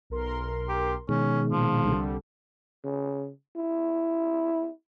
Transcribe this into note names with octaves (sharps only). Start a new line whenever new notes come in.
B1 A#4 C6
G4
B2 D#3 G#3 C#4
A#2 F3
C2 D3 G3
C#3
E4